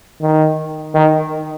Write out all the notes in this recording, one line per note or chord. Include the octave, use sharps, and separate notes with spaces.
D#3
D#3